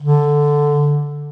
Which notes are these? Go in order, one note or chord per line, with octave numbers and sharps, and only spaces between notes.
D3